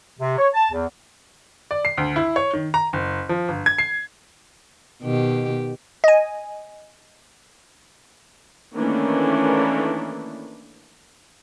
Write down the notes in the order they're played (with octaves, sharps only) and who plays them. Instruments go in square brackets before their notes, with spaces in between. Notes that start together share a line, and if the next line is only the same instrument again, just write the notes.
[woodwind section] C3
C#5
A5
E2
[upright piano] D5
C7
D2
E4
C#5
D#3
A#5
F#1
F3
G1
G#6
C7
[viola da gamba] B2 D#3 G4
[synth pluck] D#5 G#5
[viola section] D#3 E3 A3 A#3 C#4 D4